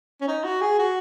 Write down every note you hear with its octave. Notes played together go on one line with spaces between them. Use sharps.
C#4
D#4
F#4
G#4
F#4